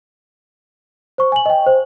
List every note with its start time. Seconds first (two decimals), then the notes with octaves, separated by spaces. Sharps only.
1.18 C5 C#6
1.32 G#5 F#7
1.46 D#5 G5
1.66 C5